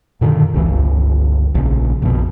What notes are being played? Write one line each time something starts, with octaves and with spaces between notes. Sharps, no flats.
F#2 A#2 D3 D#3
F1 C#2 E3
G1 C#2
A#1 C#3
A#1 F2 B2